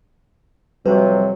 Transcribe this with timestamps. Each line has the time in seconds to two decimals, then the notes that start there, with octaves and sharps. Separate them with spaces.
0.86 F2 C3 F#3 G3 F#4 A4 B4